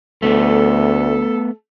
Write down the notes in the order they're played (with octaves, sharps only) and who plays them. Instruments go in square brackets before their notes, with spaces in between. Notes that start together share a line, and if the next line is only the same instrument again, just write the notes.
[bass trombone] D2 [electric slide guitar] A3 B3 [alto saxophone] A4